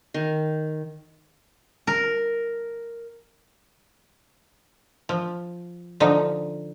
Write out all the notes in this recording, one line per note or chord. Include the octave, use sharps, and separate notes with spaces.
D#3
A#4
F3
D3 F3 D#4